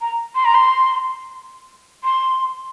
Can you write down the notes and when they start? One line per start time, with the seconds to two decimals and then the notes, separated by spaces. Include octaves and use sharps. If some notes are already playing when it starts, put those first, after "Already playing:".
0.01 A#5
0.35 C6
0.45 A#5
0.55 C6
2.04 C6